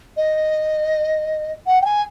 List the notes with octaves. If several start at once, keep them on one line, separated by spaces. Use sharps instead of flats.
D#5
F#5
G5
G#5